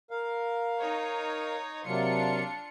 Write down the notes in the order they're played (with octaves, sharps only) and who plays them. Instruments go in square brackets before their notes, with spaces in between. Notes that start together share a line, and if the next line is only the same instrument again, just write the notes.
[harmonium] A#4 F5
[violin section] D#4 C#5
[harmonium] C3 F#3 A#3 [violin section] D4 F4 C#7